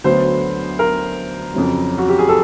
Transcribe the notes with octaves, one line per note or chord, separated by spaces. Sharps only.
D2 D3 F#3 B3 C5
A#4
F2 C#3 F#3
F#4
G4
G#4
A4